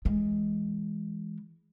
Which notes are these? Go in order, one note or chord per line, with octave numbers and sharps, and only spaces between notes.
E3 G#3